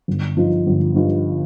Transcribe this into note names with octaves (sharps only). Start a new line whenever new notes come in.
G1
G2 F3 D#4
G1
G2 F3 D#4